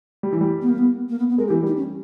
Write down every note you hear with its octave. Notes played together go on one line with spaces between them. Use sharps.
G3
E3
G3
B3
A#3
B3
A#3
B3
B3
G#3 A#4
G4
E3
G3 D#4
C#4